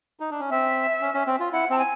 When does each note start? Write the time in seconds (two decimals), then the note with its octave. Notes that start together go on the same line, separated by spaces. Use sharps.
0.20 D#4
0.31 D4
0.40 C#4
0.50 C4 E5
1.01 C#4
1.14 C#4
1.27 C4
1.40 F4
1.53 E4 F#5
1.70 C4 A5
1.78 G#5